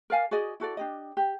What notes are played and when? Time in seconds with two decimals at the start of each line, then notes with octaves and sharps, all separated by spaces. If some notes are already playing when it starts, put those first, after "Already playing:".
0.10 A#4 D5 F5 G#5
0.31 F#4 G#4 D5 D#5
0.60 E4 F#4 A4 D5
0.77 D4 G4 D#5
1.17 G4